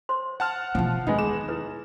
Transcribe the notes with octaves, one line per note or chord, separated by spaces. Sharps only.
C5 C6
F#5 A5 F6
B2 E3 F3
D#2 G#3 B3 D#4
G#4 E7
E4 B4